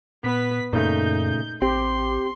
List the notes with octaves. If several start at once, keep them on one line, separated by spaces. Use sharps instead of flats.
A#2 B3 B4 B6
F#2 A#2 C#3 A3 D#4 G6
A1 C4 G4 C6